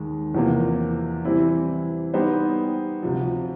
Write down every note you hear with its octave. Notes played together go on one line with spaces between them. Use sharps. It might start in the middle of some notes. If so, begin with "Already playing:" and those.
Already playing: D#2 D#3 G#3
E2 C3 F3 A#3
E3 G3 C4 E4
G3 B3 D#4 G4 C5
D2 C3 F3